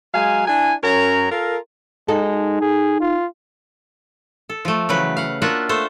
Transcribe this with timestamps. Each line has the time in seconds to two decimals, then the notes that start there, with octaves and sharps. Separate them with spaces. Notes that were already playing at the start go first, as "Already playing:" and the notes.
0.14 F#3 G#3 F5 G#5
0.47 D4 E4 G#5
0.83 F#2 C#4 A#4 C#5 A#5
1.31 F4 A4 A#4
2.08 G#3 D#4 F#4 A4
2.61 G#4
3.01 F4
4.50 A4
4.65 F3 A3
4.89 C#3 E3 F#3 B4
5.17 F5 F#5
5.42 A#3 D4 F4 F#4 E5 F#5
5.69 A3 A4 C5